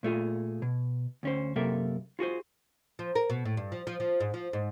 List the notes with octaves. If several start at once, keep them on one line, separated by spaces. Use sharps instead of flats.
A#2 A3 F4 G#4
B2
D2 C#4 C5
F#2 C3 A#3 A4 A#4 E5
F4 F#4 G#4 C5
F3
A#4
B2
A2
G2
F3
F3
F3
G#2
F3
G#2